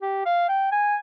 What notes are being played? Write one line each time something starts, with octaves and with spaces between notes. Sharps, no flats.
G4
F5
G5
G#5